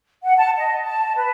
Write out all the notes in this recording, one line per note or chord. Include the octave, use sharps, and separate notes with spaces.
F#5
A5
D#5
A5
B4